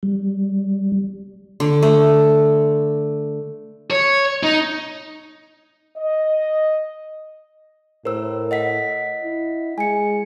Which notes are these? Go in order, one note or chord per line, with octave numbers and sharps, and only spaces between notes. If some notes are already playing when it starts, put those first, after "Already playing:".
G3
D3
A3
C#5
D#4
D#5
A2 A#4 C5 E6
D#5 F#5 B6
E4
G#3 G#5 C#7